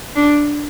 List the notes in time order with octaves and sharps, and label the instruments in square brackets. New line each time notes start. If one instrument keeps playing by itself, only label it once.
[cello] D4